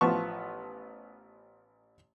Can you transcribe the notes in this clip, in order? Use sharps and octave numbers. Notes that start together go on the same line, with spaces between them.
A1 F3 B3 A5 C#6